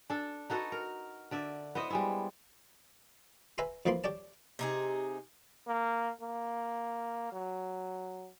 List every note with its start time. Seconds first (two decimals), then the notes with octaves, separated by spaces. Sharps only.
0.10 D4 A4
0.50 D#4 F#4 A4 B4
0.72 A#4
1.31 D3 D5 E5
1.75 B3 E4 C5 D#5
1.90 G3 G#3 E4
3.58 B4 E5 G#5 A#5 C6
3.86 F2 E3 F3 A#3 B5 C6
4.04 G4 C#5 D5 A5
4.59 C3 D#4 G#4
5.67 A#3
6.21 A#3
7.32 F#3